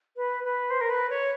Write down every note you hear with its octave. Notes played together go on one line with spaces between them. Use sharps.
B4
B4
C5
A#4
B4
C#5